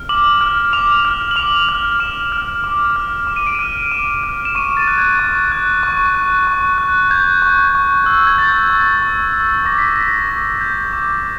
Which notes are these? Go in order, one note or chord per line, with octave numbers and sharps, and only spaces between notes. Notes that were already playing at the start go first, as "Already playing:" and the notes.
Already playing: F6
D6 F#7
F6
D6 F7
F6
F#7
D6 F7
F6
D6 E7
F6
D6
F6
D6 E7
D#7
D7
F6 D#7
D6 E7
F6
E7
C#6 D#7
A6
F#6
G#6
C#6
F#6
C#6
F#6
C#6
F#6
G6 G#6
C#6
C#6
E6
G#6
G6 A6
C#6
C#6
E6
D6 A#6
B6
A#6
G6
A#6
D6
G6
D6